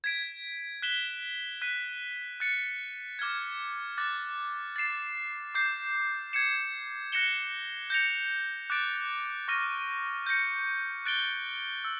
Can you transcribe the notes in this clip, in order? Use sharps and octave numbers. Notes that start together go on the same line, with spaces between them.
G#6 B6 D7
F#6 B6 E7 G7
F#6 B6 D#7
F#6 A6 C#7
D6 F6 G#6
D6 F#6 A6
A6 C7 E7
D6 G6 C7
G#6 C#7 E7
F#6 A#6 C#7 E7 G7
G6 A#6 C#7 F7
D6 F#6 A6 D7
C#6 F6 A#6 D#7
G6 A#6 C#7
F#6 A6 D7 G7
E6